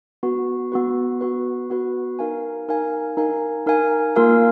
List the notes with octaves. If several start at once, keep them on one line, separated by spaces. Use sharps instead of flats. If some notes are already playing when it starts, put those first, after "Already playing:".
B3 F#4 B4
B3 F#4 B4
B3 F#4 B4
B3 F#4 B4
D#4 A#4 F5 G#5
D#4 A#4 F5 G#5
D#4 A#4 F5 G#5
D#4 A#4 F5 G#5
A#3 F4 A#4 F5 G#5